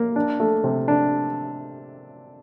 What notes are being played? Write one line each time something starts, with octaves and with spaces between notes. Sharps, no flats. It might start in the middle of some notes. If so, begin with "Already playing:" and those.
Already playing: A#3
D4
A3
C3
D4